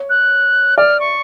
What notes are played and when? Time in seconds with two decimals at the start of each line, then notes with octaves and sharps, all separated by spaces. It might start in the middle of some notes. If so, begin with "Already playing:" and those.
Already playing: C#5
0.10 F#6
0.78 D5 F6
1.00 C#6